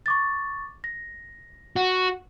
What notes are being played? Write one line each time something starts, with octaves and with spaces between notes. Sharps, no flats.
C#6 D6 A6
A#6
F#4